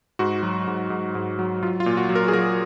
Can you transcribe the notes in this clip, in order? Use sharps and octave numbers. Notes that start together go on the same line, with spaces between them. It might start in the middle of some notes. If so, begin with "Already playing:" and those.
G#2 F#4
F#3
G#2
G#2
G#2
F#3
F#3 F4
F4
A#2
F#4
F#3
A#4
G#4
F#3 A#4